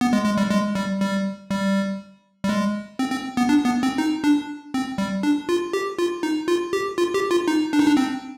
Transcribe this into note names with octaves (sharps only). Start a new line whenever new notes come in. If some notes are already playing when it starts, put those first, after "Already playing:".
B3
G#3
G#3
G3
G#3
G3
G3
G3
G3
G#3
C4
C4
B3
D4
B3
C4
D#4
D4
C4
G3
D4
F4
G4
F4
D#4
F4
G4
F4
G4
F4
D#4
D4
D#4
D4
C4